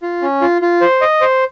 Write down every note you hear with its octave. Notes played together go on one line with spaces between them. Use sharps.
F4
C#4
F4
F4
C5
D#5
C5